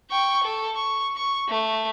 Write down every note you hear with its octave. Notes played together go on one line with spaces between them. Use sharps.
G5 C#6
A4
C#6
C#6
A3